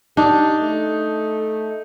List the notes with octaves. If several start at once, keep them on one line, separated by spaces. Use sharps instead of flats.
D4 D#4 G4
A3